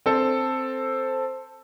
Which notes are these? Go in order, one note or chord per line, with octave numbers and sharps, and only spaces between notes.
C4 A4